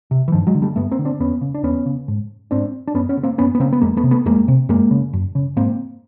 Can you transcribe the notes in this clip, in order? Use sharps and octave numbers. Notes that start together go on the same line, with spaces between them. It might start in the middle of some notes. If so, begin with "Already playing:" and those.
C3
E3
G2 D#3 F3
F#3 G#3
D3
G3 A3
G2 A3 B3
A#3 C4
D3
C4 D4
E2 B3 C#4
C#3
D4
E2 B3 C#4
C#3
G#2
G#2 C4 D4
D4
F#2 B3 C#4
B3 C#4
C#3
A#3 C4
F#2 B3 C#4
B3
C#3 A#3 C4
B3
F2 G#3 A#3
A3 B3
C3
A3 B3
F2 G#3 A#3
C3
F#2 G#3 A#3
C#3
F#2
C#3
G#2 A#3 C4